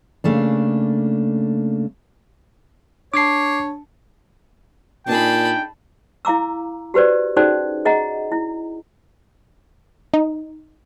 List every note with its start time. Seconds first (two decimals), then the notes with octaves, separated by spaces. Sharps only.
0.24 C#3 A3 A#3 D4
3.14 D4 C#5 A5 D6 G#6 C7
5.07 A#2 D4 D#4 G#4 G5 A5 B5
6.25 E4 F5 A#5 D6 E6
6.94 F#4 G4 B4 C5 D5
7.36 C#4 D#4 F#4 G#4 C5 D5
7.85 G#4 D#5 F#5 A#5
8.32 E4
10.14 D#4